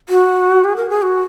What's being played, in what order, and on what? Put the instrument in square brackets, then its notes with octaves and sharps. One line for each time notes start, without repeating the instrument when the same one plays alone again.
[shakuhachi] F#4
G#4
A#4
G#4
F#4